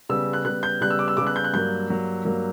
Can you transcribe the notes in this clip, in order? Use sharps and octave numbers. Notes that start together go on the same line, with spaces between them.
C#3 G3 B3 E6
F#6
C#3 G3 B3 F#6
G6
C#3 G3 B3 F#6
E6
D6
E6
C#3 G3 B3 D6
F#6
G6
F#6
G2 F#3 A#3 G6
G2 F#3 A#3
G2 F#3 A#3